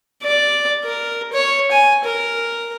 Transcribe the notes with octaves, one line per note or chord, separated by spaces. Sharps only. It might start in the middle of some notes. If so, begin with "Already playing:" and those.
D5
A#4
C#5
G#5
A#4